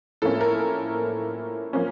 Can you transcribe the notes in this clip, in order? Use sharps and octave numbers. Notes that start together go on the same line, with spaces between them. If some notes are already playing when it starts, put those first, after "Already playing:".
A2 F3 A#3 C#4 A4
A#4
F3 A#3 C#4